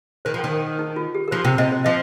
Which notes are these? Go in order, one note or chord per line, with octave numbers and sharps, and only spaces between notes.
D#3 C5
F3
G5
D#3
G5
D#4
F4
G4
A#4
F3 C5
C3 G5
C3 D#5
C5
F3 D#5